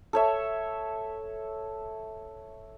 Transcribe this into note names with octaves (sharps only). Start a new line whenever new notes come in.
A4 C#5 E5